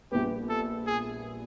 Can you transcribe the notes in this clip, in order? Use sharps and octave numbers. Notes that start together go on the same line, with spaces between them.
A#1 A#2 G3 B3 G4
A4
G#4